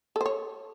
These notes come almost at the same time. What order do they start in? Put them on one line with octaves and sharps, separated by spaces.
A4 C5 C#5